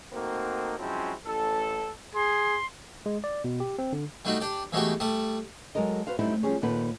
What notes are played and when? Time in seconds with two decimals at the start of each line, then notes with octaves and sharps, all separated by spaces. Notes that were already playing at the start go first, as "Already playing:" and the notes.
0.13 A3 A#3 C4 D#4 F#4
0.79 F3 F#3 G#3 C4 C#4 E4
1.25 A1 A4
2.15 G#4 C6
3.06 G#3
3.24 D5
3.44 B2
3.60 G4
3.79 C4
3.93 D3
4.25 G3 A3 D4 D#4 F#4
4.40 D4 G4 D5
4.72 E3 G#3 A3 B3 F#4 G4
5.00 G3 A3 A5 D#6
5.75 F#3 G#3 A4 A#4 D#5
6.07 F#4 B4 C5 F5
6.19 F#2 G3 A3 C4 D#4 E4
6.43 F3 G3 C#4 G#4 C#5
6.62 D#2 A#2 D#3 A4 B4 F#5